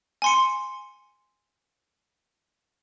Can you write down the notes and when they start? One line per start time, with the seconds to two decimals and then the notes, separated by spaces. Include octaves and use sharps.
0.22 G#5 C6 C#7